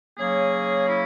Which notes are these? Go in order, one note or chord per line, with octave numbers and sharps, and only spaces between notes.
C#3 F#3 A#3 C#4 G#4
E4